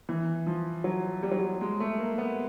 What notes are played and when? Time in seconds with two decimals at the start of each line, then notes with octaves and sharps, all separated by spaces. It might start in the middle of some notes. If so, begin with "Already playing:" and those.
0.09 E3
0.47 F3
0.84 F#3
1.23 G3
1.31 F#3
1.39 G3
1.61 G#3
1.80 A3
1.99 A#3
2.18 B3